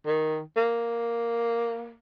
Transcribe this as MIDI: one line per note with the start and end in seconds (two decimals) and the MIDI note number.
0.06 0.39 51
0.57 1.94 58